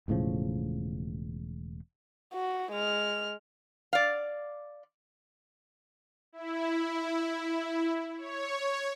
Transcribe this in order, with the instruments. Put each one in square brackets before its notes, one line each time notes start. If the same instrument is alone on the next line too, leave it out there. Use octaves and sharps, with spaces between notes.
[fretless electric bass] E1 A2 C#3 F3
[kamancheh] F#4
G#3 F6
[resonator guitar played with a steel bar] D5 F5
[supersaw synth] E4
C#5